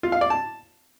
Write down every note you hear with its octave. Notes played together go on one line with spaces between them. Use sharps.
F4
F5
D5
A5